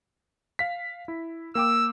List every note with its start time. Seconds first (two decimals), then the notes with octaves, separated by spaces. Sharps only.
0.59 F5 B6
1.08 E4
1.55 A#3 G5 D6 E6